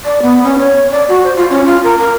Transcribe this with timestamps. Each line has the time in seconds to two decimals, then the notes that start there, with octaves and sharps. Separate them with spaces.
0.05 D5
0.22 B3
0.44 C#4
0.58 C#5
0.91 D5
1.09 F#4
1.24 C5
1.36 F4
1.50 C#4
1.65 F4
1.83 A#4
1.98 A#4